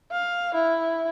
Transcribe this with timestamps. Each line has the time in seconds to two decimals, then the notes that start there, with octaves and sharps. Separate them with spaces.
0.11 F5
0.54 E4